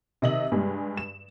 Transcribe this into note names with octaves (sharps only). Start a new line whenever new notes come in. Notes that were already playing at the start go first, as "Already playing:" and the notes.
C3 D#3 D#5 E5 F#7
G2 G3 G#3
E7